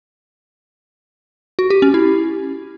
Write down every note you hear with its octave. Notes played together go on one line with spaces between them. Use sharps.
F#4
G4
C#4
E4